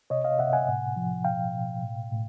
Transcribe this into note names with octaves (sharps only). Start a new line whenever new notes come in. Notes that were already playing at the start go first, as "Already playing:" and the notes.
C3 C#5 D#5
D#5 F5
C3 E5 F#5
F#5 G#5
A2
F3
B2 F5 G5
B2
A2
A2